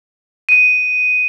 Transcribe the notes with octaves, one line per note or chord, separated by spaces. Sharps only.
D#7